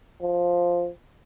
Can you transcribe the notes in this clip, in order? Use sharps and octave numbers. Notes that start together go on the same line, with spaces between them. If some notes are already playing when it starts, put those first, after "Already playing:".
F3